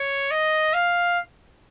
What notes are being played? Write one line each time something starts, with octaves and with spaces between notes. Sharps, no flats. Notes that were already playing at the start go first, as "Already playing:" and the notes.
Already playing: C#5
D#5
F5